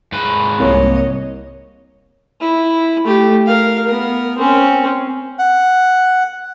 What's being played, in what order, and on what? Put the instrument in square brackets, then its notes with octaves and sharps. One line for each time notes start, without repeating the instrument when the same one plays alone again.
[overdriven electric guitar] G#2 B4
[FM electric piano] C2 A#3 [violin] C#5 D#5
[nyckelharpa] E4
A3 G4
A#4 F5
B3 A#4
C4 C#4
[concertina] F#5